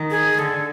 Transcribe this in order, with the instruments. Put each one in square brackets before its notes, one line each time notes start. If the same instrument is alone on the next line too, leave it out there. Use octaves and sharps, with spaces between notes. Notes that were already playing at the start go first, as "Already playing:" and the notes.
Already playing: [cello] D#3
[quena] G#4
[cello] D3 [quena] A4